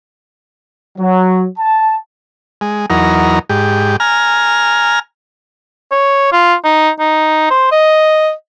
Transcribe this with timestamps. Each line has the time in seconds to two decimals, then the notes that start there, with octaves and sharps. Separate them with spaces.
0.98 F#3
1.58 A5
2.61 G#3
2.90 E2 F#3 D#4 A#4
3.49 G#2 G4
4.00 G#5 A#5 F6
5.91 C#5
6.32 F4
6.64 D#4
6.99 D#4
7.50 C5
7.71 D#5